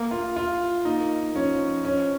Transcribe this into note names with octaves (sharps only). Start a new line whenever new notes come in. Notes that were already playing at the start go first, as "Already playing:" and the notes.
Already playing: A#3
F4
F4
A#3 D#4
F3 C#4
C#4